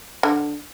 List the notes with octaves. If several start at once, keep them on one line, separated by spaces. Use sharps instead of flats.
D3